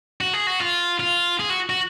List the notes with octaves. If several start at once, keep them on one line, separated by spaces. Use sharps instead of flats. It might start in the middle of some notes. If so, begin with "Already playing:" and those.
F#4
G#4
F#4
F4
F4
G#4
F#4
F#4